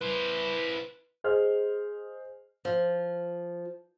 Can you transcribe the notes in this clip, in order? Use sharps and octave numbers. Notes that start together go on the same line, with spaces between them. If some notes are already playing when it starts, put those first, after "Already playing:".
E4 B4 C5
G#4 C5 D#5 F6
F3